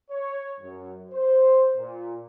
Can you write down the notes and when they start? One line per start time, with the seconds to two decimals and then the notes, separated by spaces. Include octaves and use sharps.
0.11 C#5
0.60 F#2
1.11 C5
1.76 A#2